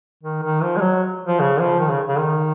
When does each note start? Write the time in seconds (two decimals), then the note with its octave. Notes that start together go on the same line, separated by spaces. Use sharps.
0.23 D#3
0.43 D#3
0.62 F3
0.77 G#3
0.81 F#3
1.26 F3
1.40 C#3
1.60 F3
1.80 D#3
1.90 C#3
2.08 C#3
2.19 D#3